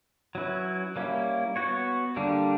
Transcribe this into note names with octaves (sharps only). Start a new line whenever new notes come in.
F#3 C#4 E4 B4
G3 A#3 C#4 E4
B3 F#4 C#5
D3 G3 A#3 D4